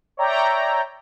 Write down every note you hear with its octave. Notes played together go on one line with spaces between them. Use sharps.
C#5 D5 E5 G5 A#5